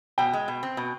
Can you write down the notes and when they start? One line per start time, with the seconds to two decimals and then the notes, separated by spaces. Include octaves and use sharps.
0.18 B2 G5
0.33 G#3
0.48 B2
0.63 C4
0.77 B2